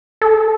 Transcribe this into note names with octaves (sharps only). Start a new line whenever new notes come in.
A4